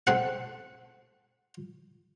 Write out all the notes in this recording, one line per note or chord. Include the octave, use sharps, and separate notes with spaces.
C4 A4 F#5